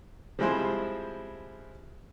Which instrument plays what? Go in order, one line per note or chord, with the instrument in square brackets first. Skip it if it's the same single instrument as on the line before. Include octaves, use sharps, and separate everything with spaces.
[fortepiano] F3 G3 G#3 C4 E4 C5